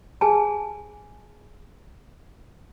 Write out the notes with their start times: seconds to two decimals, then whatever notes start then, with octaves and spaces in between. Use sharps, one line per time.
0.21 G#4 G#5 A5